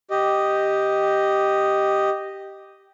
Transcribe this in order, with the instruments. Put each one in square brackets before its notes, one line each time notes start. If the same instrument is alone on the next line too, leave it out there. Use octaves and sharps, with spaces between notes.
[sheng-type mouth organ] G4 D#5